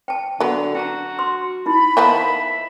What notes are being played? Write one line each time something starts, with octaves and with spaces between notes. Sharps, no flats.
G5 A5
D3 F#3 B3
D4 F#4 A5 A#5
C6
D#4 E4 B5
D#3 F3 B3 E5